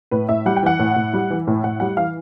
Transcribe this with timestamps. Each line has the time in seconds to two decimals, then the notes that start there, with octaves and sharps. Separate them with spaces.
0.11 A2 B4
0.29 A2 E5
0.46 G3 F#5
0.56 G5
0.63 E3 F#5
0.79 A2
0.96 A2
1.13 G3
1.30 E3
1.47 A2
1.64 A2 F#5
1.80 G3 F#5
1.97 E3 F5